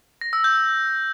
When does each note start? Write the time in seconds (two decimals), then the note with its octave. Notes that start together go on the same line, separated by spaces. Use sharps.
0.21 A#6
0.33 E6
0.44 G6